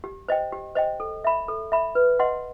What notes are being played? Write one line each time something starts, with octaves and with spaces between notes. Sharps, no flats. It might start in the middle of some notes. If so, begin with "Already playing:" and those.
G4
C5 D#5 G5
G4
C5 D#5 G5
A4
E5 B5
A4
E5 B5
B4
D#5 F#5 C6